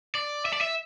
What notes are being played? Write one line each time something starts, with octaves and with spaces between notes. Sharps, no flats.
D5
E5
D5
E5